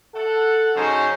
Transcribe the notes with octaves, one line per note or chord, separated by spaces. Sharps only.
A4 F#5
G#2 C#3 F#3 C#4 D#4 C5